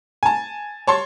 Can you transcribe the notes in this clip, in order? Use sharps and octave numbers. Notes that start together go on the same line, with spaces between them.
G#5 A5
C#5 A5 C6 C#6 A6